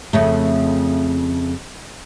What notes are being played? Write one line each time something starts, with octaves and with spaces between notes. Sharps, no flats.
F2 C#3 A3